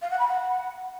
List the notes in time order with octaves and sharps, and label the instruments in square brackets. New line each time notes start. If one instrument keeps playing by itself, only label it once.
[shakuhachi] F5
F#5
B5
F#5